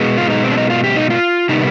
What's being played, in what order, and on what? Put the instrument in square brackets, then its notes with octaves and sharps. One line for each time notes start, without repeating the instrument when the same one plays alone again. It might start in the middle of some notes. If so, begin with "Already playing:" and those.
Already playing: [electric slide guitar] B2 G#3 B3
F4
D#4
C4
D4
D#4
F4
G4
D#4
F4
C3 D#3 G3 B3 D#4